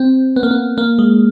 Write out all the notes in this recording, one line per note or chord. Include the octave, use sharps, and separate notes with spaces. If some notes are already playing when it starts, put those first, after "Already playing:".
Already playing: C4
B3
A#3
B3
A#3
G#3